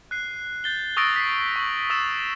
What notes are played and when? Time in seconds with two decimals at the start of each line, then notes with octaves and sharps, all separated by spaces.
0.11 F#6 C7
0.64 G6 A6 G7
0.97 C#6 D#6 E6 A6 A#6 D7
1.16 B6 C7
1.56 C#6 F#7
1.90 D#6 E6 A6 E7